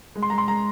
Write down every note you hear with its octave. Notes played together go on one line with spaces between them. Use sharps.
G#3
C6
G#3 A#5
C6
G#3 A#5